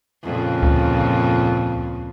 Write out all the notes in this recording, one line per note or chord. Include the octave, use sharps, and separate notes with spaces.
F2 A#2 C#3
D2